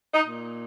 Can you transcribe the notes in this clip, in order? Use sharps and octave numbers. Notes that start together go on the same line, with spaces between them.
D#4
A#2